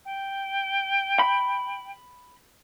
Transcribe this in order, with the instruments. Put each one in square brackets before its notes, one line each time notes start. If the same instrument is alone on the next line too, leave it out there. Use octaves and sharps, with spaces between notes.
[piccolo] G5
[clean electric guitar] B5